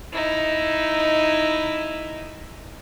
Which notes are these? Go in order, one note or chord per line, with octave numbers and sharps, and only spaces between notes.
D#4 E4